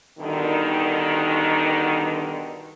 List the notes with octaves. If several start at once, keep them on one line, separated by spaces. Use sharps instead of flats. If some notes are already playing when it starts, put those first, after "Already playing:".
G2 B2 D3 D#3